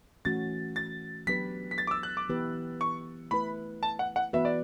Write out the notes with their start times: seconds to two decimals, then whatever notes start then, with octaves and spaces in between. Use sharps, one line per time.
0.25 E3 A3 C#4 F#4 A6
0.76 A6
1.27 F#3 B3 D4 G4 B4 B6
1.71 B6
1.78 A6
1.87 D6
1.91 E6
2.03 F#6
2.17 D6
2.29 E3 B3 E4 G4 B4
2.81 C#6
3.31 A3 E4 B4 B5
3.83 A5
3.99 F#5
4.16 F#5
4.33 E3 B3 F#4 B4 E5
4.45 D5